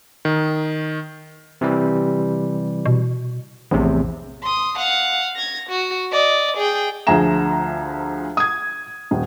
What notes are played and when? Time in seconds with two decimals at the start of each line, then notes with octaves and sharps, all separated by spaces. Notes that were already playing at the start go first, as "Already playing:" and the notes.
0.25 D#3
1.61 C3 E3 G3
2.86 B2
3.71 A#1 E2 A2 C3
4.43 C6 D#6
4.78 F5 F#5
5.36 G#6 A#6
5.69 F#4
6.12 D5 D#5
6.57 G#4 G5
7.07 D2 F3 G#4 E5 A#5 E7
8.37 D#6 G#6
9.11 D#1